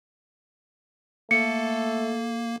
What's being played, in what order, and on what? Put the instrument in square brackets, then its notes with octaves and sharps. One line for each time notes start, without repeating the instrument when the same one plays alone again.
[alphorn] A3 [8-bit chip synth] A#3 [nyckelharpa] A4 [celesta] C#7